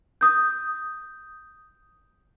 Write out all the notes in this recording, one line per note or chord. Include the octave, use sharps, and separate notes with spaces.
D#6 G6